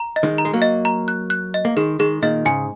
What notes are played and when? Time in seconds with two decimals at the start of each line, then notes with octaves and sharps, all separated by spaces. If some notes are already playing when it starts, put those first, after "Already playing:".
Already playing: A#5
0.16 D#5
0.23 D#3 G#3
0.38 A#5
0.45 G#3
0.54 F#3 A#3
0.62 D#5
0.85 A#5
1.08 F#6
1.30 F#6
1.54 D#5
1.65 A#3
1.76 D#3 G#3 G#4
1.99 D#3 G#3 G#4
2.22 A#2 D#3 D#5
2.45 G#2 C#3 G#5